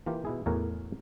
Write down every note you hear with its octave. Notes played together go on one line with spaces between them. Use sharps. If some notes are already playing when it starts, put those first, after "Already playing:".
E3 A#3 F4 G4
B2 E4 G#4
E2 A2 F#4 A#4 G#5